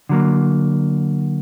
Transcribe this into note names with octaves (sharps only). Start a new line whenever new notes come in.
D3 F#3 A#3